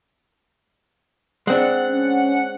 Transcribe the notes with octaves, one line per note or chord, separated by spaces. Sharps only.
G#3 C4 D4 F#5
C#4